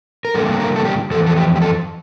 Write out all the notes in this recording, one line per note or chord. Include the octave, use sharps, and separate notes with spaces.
A#4
G2 D3 G3 A#3 A4
A4
A#4
A4
G4
F2 E3 A4
A4
G4
G4
A4